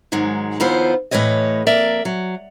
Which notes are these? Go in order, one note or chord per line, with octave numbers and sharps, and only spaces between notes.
G#2 D#3 F#3 G#3
D#2 F3 B3 E4 F4 C5
A2 E3 B4 C#5 D#5
F2 A#3 A#4 D5 E5
F#3